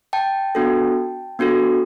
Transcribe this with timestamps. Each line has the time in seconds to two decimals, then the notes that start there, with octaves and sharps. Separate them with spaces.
0.13 G5 A5
0.55 B3 D4 F#4 A4
1.39 B3 D4 F#4 A4